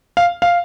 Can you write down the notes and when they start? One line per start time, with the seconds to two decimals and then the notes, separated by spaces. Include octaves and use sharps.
0.17 F5
0.42 F5